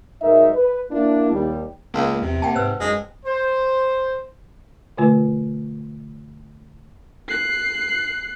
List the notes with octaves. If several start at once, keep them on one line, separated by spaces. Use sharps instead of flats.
G#2 F#3 D#4 A#4 E5
B4
A#3 D4 E4
D#2 G3
C#2 A#3
E2 C3
A#3 F#5 G5 A5
G#2 B4 C5 E6
F#2 G#3
C5
B2 D3 A3 F4 B4
F#6 C7